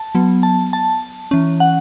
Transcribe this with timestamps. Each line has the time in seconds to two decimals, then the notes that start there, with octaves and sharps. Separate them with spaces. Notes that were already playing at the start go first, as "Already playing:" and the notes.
Already playing: A5
0.15 F#3 B3
0.43 A5
0.73 A5
1.31 E3 C#4
1.60 F#5